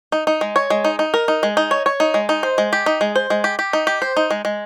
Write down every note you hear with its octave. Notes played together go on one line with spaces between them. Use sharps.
D#4
D#4
G#3
C#5
G#3
D#4
D#4
A#4
D#4
G#3
D#4
C#5
C#5
D#4
G#3
D#4
C5
G#3
G4
D#4
G#3
C5
G#3
G4
G4
D#4
G4
C5
D#4
G#3
G#3